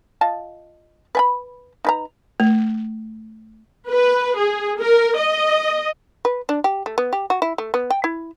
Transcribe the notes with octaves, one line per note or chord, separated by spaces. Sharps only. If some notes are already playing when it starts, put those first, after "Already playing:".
F4 D#5 A5
B4 G#5 B5
D#4 B4 A#5
A3
B4
G#4
A#4
D#5
B4
D4
G4
A3
B3
G4
F#4
E4
A3
B3
G5
E4